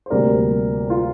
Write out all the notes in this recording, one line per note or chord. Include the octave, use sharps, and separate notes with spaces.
C5
D2 C3 G3 A#3 A#4 D5
F4